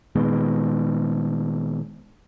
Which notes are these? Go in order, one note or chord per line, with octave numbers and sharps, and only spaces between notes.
A#2 D#3 G#3 B3